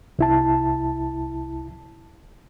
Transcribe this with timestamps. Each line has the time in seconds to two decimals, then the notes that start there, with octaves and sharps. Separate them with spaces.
0.19 C2 E4 A5